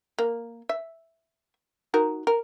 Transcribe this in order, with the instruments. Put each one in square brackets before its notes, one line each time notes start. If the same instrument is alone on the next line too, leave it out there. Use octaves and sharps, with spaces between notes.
[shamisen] A#3
E5
D#4 F#4 A#4
A#4